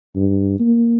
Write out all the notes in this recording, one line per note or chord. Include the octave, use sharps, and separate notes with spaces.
G2
A#3